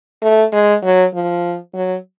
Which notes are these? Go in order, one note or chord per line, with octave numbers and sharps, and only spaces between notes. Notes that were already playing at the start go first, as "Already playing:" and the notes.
A3
G#3
F#3
F3
F#3